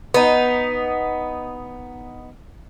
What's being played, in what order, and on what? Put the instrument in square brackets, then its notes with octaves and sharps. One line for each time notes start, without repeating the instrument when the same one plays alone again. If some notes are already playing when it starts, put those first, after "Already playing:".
[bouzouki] B3 D#4